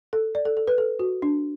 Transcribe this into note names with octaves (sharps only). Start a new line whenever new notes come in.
A4
D5
A4
A4
B4
A4
F#4
D4